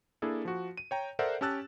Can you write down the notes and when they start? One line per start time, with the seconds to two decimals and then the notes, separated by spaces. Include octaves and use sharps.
0.22 A#3 D4 E4 G#4 A4
0.45 F3 F#4
0.77 D#7
0.91 C#5 G5 A#5
1.19 A4 A#4 C5 D5 E5 F#5
1.41 C#4 G4 A5 E6 F#6 A6